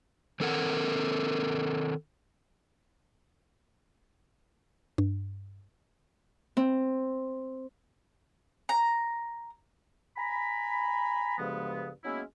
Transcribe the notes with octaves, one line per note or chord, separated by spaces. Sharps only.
D#3 C4 A4 A#4 F#5
G2
C4
A#5
G#5 A#5 B5
D2 G2 C#3 F3 G#3 B3
F#3 G#3 A#3 B3 C#4 E4